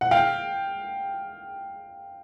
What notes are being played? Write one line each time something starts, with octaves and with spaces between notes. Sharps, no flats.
F#5
F5 G5